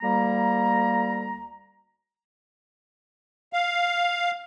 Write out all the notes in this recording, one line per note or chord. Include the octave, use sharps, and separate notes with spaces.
D2 G3 A#3 A#5
F5